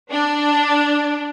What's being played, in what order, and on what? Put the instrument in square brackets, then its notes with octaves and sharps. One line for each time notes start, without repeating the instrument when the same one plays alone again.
[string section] D4